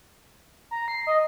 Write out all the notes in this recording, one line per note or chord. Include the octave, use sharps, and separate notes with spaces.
A#5
C7
D#5